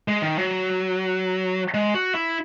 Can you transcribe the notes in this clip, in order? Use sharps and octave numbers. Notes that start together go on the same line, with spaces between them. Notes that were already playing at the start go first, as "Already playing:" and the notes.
G#3
D#3
F#3
G#3
F#4
E4